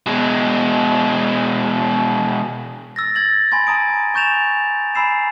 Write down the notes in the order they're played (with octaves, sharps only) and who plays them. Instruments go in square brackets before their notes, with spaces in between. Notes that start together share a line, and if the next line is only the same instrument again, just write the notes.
[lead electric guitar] B2 G#3
[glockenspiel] E6 A6 A#6
G#6 A6 F#7
G#5 B5 C6 G#6 A6
A5 A#5 D#6 D7
G#5 C#6 G6 A6 E7 F7
G#5 A#5 B5 E6 C7 E7